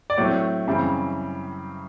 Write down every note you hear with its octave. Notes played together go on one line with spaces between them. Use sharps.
D5
A2 F#3 A3 C4 C#5
F#2 C#3 E3 G3 C4